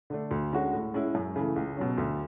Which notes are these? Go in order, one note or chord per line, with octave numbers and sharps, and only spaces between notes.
D3 A3 D4
D2
D3 G#3 C#4 F#4
A2
G#3 C#4 E4
F#2
C#3 E3 A3
C#2
B2 F#3 C#4
D2